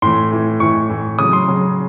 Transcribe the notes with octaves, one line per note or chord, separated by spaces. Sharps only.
A2 E3 C6
A2 E3
A2 E3 C#6
A2 E3
C#3 F#3 D#6
C6
C#3 F#3